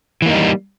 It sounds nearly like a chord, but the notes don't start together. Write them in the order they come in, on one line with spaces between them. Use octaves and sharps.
E3 A#3 D#4 G3